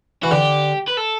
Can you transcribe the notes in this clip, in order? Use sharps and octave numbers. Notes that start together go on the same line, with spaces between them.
E3 F#4
D3 G4
B4
A4